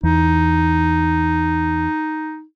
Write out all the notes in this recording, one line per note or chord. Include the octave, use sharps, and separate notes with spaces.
E2 D#4